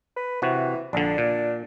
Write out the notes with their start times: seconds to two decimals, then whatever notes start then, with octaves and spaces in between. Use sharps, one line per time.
0.17 B4
0.42 C3 E3 F#4
0.93 A#1 D3 D4
1.18 A#2